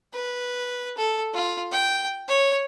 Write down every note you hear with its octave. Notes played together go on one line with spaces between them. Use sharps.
B4
A4
F4
G5
C#5